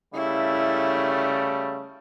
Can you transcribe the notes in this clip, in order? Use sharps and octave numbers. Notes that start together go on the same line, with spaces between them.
C#3 G3 A3 E4